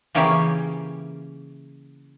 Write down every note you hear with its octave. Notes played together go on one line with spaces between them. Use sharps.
C#3 E3 A#3 C#4 G4 G#4